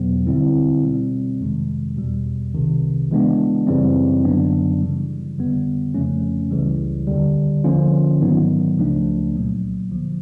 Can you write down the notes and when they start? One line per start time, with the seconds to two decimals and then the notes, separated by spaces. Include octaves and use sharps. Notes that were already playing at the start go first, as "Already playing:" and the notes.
Already playing: E2 B2 F#3 B3
0.27 D2 D3 G3 C4 E4
0.84 B2 G3 C4
1.40 F2 C3 D#3 G#3
1.96 E2 B2 G3
2.54 C2 C3 D#3
3.11 C#3 E3 G#3 B3 D4
3.67 F#2 C#3 E3 G3 C4
4.24 F#2 D3 F#3 B3 D4
4.81 C#3 E3 G3
5.38 F2 D3 G3 B3
5.94 F2 C#3 F3 A3 C#4
6.51 C#2 C#3 E3 G3
7.07 D#2 D3 G3
7.64 D3 F3 A#3 C#4 F4
8.21 G#2 D#3 F#3 B3 D#4
8.79 C#2 C#3 F3 A3 D4
9.35 C2 A#2 F#3 A#3
9.91 D2 D3 F3